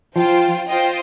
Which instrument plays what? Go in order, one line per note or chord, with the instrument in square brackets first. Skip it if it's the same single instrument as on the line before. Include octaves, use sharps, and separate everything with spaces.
[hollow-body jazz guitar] F3 [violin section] F4 C5 G5
[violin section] F4 C5 D#5 G5